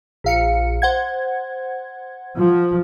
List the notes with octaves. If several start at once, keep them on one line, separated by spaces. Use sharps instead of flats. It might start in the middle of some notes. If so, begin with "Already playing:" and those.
A#1 F5 C#7
C5 F#5 G#6
F3